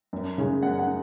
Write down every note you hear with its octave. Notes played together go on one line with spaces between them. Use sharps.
F#2
C#3 G#3 C#4
F#2 F#5
F#5
C#4